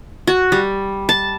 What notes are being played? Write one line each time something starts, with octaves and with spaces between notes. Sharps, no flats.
F#4
G3
A5